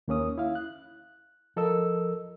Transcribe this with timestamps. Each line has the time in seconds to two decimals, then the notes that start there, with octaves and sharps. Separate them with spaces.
0.08 D#2 A#3 C#4 D#6
0.38 E4 F5
0.55 F#6
1.57 F3 A4 A#4 D#5 E6